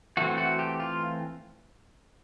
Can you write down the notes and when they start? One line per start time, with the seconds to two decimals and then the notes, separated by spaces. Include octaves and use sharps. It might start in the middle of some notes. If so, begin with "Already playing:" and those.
0.17 E3 A3 C4 F#4
0.38 F#4
0.59 G4
0.80 F4